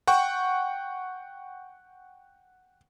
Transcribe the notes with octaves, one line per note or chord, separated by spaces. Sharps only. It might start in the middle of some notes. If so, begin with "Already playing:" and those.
F#5 G5 C#6